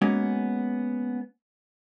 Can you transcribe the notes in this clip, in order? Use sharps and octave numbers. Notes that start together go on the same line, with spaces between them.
G#3 A#3 B3 C#4 F#4